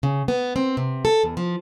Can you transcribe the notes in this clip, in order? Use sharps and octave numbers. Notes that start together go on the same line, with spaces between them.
C#3
B3
C4
C3
A4
E2
F3